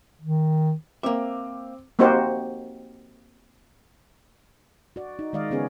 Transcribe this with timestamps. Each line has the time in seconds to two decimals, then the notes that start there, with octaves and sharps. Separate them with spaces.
0.21 D#3
1.03 A#3 C4 E5 D6
1.99 A#3 C4 D#4 F#4 G4 C5
4.96 F#4 D5
5.19 D#4
5.33 D#3 G#3 D5 D#5 F5
5.51 C#3 B3 C#4 G#4 C#5